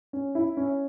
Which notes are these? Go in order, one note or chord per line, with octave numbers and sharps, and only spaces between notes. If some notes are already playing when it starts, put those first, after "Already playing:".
C#4
E4
C#4